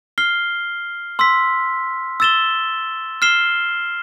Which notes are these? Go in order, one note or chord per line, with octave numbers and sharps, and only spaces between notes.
F6 C7 G7
C6 E6 B6
E6 A6 E7 G7
F6 C7 E7 G7